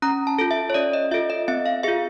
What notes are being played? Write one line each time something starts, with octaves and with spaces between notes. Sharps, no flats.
C#4 A#5
A5
F4 A4
E5
C#5
C#4 D5
D#5
F4 A4 E5
D#5
C4 E5
F5
F4 G#4 E5